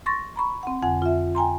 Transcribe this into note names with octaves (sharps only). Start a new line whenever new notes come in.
C6 C#6 A6 A#6
A#5 B5 C#6
C4 F#5
F2 D3 F#5 G#5
F4 E5
G5 G#5 A#5 C6